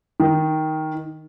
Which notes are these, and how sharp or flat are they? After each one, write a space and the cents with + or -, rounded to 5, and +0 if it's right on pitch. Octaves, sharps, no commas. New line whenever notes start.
D#3 +10